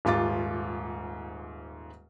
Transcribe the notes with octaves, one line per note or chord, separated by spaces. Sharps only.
D#1 G#2 F4 D6 A6